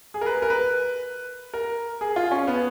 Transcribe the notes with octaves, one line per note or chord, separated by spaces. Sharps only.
G#4
A#4
B4
A#4
B4
A#4
G#4
F4
C#4
B3